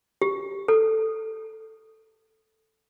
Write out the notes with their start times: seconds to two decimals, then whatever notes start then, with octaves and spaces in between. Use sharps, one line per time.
0.22 G4
0.68 A4